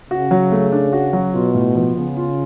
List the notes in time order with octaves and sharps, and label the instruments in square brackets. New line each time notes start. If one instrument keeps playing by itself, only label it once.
[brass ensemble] C#3 [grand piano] F#4
[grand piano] F#3
A3
D4
F#4
F#3
[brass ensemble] B2 [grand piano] F4
[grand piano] A2
F3
[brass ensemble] C#3 [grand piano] B3
[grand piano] F4